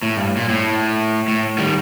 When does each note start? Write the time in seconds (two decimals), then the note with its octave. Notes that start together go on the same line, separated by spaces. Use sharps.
0.03 A2
0.17 G2
0.37 A#2
0.49 A2
1.28 A2
1.58 D#3 G3